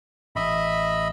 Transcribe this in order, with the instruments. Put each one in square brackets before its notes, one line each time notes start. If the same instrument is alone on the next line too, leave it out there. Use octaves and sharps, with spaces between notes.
[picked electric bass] A1 [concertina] D#5 E5 B5